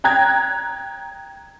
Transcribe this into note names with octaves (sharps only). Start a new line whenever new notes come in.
G5 A#5 F#6 G#6